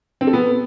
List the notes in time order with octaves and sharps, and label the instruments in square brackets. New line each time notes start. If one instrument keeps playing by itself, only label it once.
[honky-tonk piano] C4
A4
B3